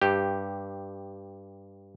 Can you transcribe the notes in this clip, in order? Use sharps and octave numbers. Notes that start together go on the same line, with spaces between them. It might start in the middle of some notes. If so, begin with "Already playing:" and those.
G2 G4